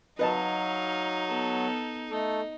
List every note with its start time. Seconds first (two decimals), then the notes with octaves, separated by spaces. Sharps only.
0.19 F#3 D#4 B4 D#5 F5 A5
1.28 B3 A4
2.11 A3 D#4 A4